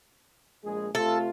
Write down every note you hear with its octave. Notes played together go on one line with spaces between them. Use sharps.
A#1 G#3 G#4
C3 A3 F4 A4